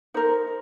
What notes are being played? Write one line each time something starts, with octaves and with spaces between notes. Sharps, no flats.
D#4 A#4 C5